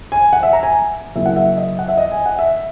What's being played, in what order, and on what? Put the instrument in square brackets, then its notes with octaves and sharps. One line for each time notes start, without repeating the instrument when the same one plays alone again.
[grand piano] G#5
F#5
E5
A#5
G#5
C#3 F#3 A#3 E4 E5
F#5
E5
D#5
F#5
E5
D#5
G#5
F#5
E5